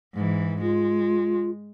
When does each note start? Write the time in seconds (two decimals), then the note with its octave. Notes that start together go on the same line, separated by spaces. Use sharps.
0.14 G#2 E3
0.61 G#3 F4